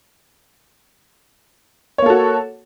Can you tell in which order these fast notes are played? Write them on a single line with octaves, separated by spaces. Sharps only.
C#5 A#3 A4 F#4